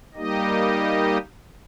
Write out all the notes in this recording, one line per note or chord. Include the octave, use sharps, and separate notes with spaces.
G3 A#3 D#4 G4 D#5